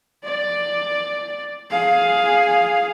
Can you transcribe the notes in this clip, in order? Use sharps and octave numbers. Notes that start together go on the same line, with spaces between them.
D5
G#4 F5